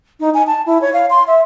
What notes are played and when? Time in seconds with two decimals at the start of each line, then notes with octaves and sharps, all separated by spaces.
0.20 D#4
0.34 G#5
0.47 A5
0.66 E4
0.81 C#5
0.94 F5
1.10 C6
1.27 E5